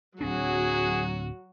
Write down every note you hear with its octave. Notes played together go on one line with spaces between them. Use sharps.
D1 F#3 C4 D4 F#4 G#4